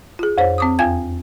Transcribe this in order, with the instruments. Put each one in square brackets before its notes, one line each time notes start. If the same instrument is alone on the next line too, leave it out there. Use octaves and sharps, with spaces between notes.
[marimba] F4 G#4
F2 C5 C#5
C4 D6 D#6
E2 F4 G5 G#5 G#6